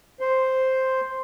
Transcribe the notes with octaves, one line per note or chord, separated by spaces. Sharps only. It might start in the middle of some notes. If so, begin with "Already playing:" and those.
C5